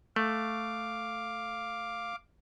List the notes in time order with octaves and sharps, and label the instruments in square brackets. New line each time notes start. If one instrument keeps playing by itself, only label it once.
[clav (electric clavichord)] A3 [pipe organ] F5 D6